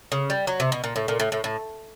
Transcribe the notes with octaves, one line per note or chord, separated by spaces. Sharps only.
C#3
G3
F#3
C3
B2
A#2
A2
A#2
A2
A2
A2